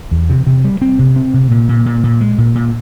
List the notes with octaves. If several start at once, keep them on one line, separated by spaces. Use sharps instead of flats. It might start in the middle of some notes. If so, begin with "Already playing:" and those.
E2
C3
C3
G3
C4
C3
C4
C3
A#2
A#2
A#2
A#2
G#3
A#2
A#2